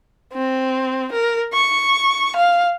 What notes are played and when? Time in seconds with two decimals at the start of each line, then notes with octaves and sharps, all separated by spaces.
0.33 C4
1.12 A#4
1.53 C#6
2.36 F5